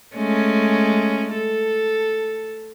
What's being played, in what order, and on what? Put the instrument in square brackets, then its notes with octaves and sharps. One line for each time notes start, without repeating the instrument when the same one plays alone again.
[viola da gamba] G#3 A3 C#4
A4